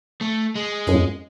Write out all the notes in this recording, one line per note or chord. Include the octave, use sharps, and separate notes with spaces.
A3
G#3
F#2